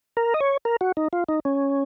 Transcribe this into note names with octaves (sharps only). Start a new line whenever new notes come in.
A#4
D#5
C#5
A#4
F#4
D#4
F4
D#4
C#4